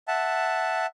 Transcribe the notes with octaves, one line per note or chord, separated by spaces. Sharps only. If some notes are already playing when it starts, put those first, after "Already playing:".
E5 F#5 A5